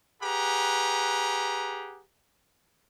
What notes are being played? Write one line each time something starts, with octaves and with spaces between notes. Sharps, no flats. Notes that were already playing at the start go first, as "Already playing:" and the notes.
G4 G#4 B4 F#5 A#5